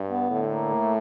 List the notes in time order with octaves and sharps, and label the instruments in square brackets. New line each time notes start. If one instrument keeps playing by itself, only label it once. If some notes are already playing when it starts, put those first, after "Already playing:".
Already playing: [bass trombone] G2
[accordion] B3
[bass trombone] A2 [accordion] D3
[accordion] A#3
A3